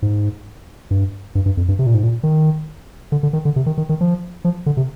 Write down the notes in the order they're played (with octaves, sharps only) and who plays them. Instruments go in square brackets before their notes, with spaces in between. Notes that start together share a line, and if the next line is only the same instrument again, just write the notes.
[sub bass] G#2
G2
G2
G2
F2
G2
C3
A#2
G#2
A#2
D#3
D3
D3
D#3
D3
C3
D#3
D#3
D#3
F3
F3
D3
C3